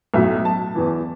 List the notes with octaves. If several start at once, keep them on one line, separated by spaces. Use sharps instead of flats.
B1 A2 F#3 E5
A5
E2 E3